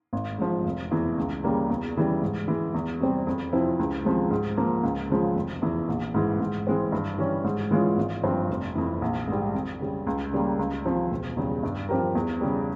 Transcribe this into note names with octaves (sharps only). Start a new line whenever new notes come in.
G#1
G#2 F3
F1
E2 E3
C#2
C#3 G3 A#3
E2
C#3 E3 G3
G#2
E3 G#3
E2
C3 G3 C4
F2
C3 F3 C4 E4
C#2
C3 F3 G#3
G#2
F3 A#3
C#2
C#3 F3 G#3
F1
E2 E3
A#1
G#2 E3
G#2
E3 G#3 C4
G2
E3 G3 C#4
G#2
E3 G#3 C#4 F4
G#1
G2 F3 C4
F1
F2 E3
A#1
G#2 G3
F2
C#3 G3
C#2
C#3 G3 A#3
C#2
C3 F3
E1
E2 C#3 G3
G2
F3 C4 G4 A#4
E2
C#3 G3